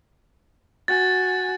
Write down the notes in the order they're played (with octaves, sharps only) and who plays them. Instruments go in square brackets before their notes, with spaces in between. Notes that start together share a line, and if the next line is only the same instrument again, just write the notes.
[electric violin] F#4 G#5 [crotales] A6